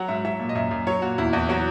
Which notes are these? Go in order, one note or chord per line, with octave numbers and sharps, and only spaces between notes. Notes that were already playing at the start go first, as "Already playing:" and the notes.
Already playing: F#3 F#5
G#2 E5
F#3 E5
A#2
D#5
F#2 E5
F#2
F#3 C#5
A#2 F#4
E2 E4
E2 F#4
F#3 F#4